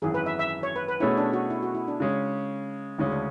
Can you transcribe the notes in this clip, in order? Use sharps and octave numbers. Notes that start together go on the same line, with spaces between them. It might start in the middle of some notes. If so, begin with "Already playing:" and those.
G#1 F#2 E3 G#4
B4
E5
E5
C#5
B4
B4
B2 A3 C#4 E4 G#4 C#5
D4
F#4
E4
F#4
E4
D4
C#3 G#3 C#4
D2 C#3 G#3 C#4 E4
D4